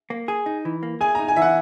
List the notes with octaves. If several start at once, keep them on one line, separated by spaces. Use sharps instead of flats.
A#3
G#4
D#4
E3
A#3
G#4 G#5
D#4 A#5
G#5
E3 E5
F#5